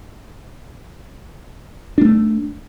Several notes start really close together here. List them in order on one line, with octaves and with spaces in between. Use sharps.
D4 A#3 A3